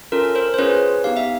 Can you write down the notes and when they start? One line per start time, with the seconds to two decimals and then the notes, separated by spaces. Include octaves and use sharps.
0.12 C#4 F4 A4 A#4
0.35 A#4 C5
0.54 C5
0.58 C#4 F4 G#4 B4 C#5
1.04 B3 D#4 G4 F5
1.17 E5